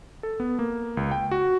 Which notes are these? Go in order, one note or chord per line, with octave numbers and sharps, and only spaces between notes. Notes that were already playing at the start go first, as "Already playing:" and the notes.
A4
B3
A#3
C#2
G5
F#4